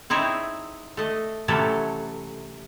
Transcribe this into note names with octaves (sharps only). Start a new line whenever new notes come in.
C4 D#4 E4 G#4 C#5
A3 D#5
C3 E3 F#3 A3 C#4 A4